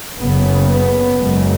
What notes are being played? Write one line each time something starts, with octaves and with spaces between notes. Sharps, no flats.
F#1 F#2 C#3 B3
B3
F#1 F#2 C#3 G#3